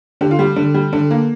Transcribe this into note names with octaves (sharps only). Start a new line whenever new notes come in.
D3 G4
F4
G3 G4
D3
G3
D3
A#3